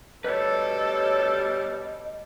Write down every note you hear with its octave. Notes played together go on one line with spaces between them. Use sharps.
D2 B2 G3 A4 B4 C#5 D#5